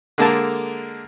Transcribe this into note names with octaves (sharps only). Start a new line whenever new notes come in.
D3 G#3 A#3 A4 A#4 A5